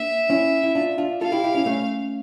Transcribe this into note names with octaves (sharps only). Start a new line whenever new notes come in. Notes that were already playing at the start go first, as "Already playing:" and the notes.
Already playing: A#3 D4 E5
C#4 E4
E4
D4 F4
D4 F4
F4 A4 F5
E4 G4
E4 G4
C#4 E4
A3 C#4